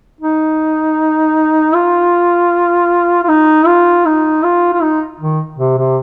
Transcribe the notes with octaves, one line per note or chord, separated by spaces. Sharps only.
D#4
F4
F4
D#4
F4
D#4
F4
F4
D#4
D#3
C3
C3